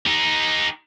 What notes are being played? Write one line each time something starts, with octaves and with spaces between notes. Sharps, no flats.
D#4 G4